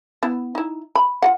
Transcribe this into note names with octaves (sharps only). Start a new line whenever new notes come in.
B3 E4
D#4 E4
B5
F4 F#4 F#5